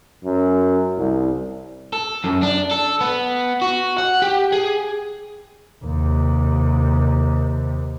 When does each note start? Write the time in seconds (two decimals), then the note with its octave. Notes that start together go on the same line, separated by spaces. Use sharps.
0.24 F#2
0.97 C2
1.93 A4
2.24 F#2
2.43 D4
2.71 A4
3.01 B3
3.62 F#4
3.98 F#5
4.22 G4
4.52 G#4
5.85 D#2 C3